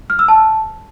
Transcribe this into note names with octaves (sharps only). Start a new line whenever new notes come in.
F6
E6
A5